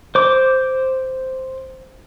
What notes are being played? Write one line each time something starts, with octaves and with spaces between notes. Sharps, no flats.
C5 D6